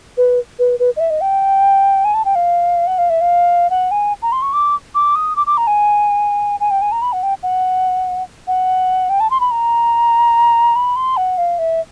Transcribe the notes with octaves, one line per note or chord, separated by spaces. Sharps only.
B4
B4
B4
D#5
E5
D#5
G5
G#5
A5
G5
F5
F#5
F5
E5
F5
F#5
G#5
A#5
C6
C#6
D6
D6
D#6
D6
D6
A#5
G#5
G#5
G5
G#5
A#5
B5
F#5
G5
F#5
F#5
G5
A5
C6
B5
A#5
B5
C6
F#5
F5
E5